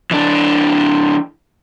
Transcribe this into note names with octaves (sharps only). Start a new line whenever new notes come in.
E3 D4